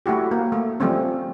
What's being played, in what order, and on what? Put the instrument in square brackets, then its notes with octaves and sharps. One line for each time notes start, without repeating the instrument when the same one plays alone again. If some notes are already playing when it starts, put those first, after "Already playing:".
[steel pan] A3 E4 F#4 G4
A#3
A3
F3 G3 A3 C4 C#4